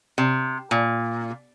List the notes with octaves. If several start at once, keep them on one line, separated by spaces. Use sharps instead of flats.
C3
A#2